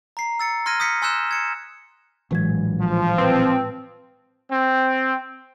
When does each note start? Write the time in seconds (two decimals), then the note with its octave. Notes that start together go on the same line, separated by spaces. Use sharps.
0.17 A#5 C7
0.40 E6 A6 C#7
0.66 C6 F6 G#6 A#6 D#7
0.80 D#6 G6 B6 C#7
1.02 G#5 C6 E6 F#6 G6 E7
1.31 G#6 C#7 E7
2.31 A#1 A2 E3 F#3 G#3 G#6
2.81 F3
3.18 C4 B4 C5 A5
4.50 C4